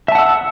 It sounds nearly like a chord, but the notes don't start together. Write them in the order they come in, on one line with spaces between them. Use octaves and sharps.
E5 A5 F#5 E6